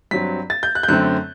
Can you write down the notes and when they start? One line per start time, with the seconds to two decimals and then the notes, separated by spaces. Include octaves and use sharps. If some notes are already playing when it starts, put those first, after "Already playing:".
0.11 G2 F#3 C4 B6
0.50 A6
0.63 G6
0.75 F#6
0.83 G6
0.88 F#2 D3 A3 C4 F#6